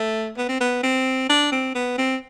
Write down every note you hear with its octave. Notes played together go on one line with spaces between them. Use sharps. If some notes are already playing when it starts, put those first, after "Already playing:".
Already playing: A3
B3
C4
B3
C4
D4
C4
B3
C4